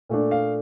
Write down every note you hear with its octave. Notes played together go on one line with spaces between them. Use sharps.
A#2 A3 D4
F5